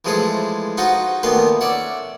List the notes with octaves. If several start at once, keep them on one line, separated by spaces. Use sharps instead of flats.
E3 F3 G#3 A3 G#4 A4
D#4 F4 F#4 C5 F#5
A#2 D#3 A3 B3 B4 C6
C#4 D5 E5 F#5